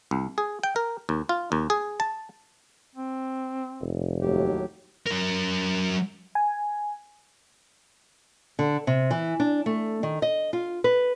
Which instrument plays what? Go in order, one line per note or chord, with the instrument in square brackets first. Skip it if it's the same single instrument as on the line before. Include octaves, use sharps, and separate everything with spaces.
[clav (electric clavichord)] C2
G#4
G5
A#4
D#2
F4
D#2
G#4
A5
[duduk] C4
[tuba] F1
[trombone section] D#2 A2 F#3 [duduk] G4
[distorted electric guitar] F#3 A#4
[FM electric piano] G#5
[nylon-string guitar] D3
C3
E3
D4
A3
D#3
D#5
F4
B4